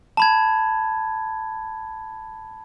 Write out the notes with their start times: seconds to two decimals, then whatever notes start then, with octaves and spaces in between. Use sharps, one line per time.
0.17 A5 B5 G#6